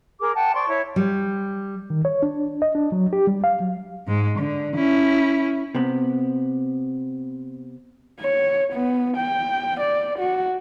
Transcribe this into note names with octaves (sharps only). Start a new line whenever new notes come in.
G#4 A#4 D6
F#5 G5 A5
C5 D5 C6 C#6
E4 C#5
G3
D#3
C#5
D4
D#5
D4
F#3
G4
G3
F5
F#3
G#2 G#3
D3
C#4 E4
C3 B3
C#5
B3
G5
D5
F#4